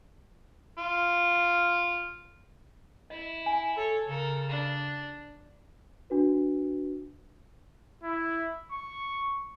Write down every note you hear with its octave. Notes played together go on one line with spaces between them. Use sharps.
F4
E4 D#5
G#5
A4 C#5
C#3 A4 A#4
D4
D4 F#4 B4
E4
C#6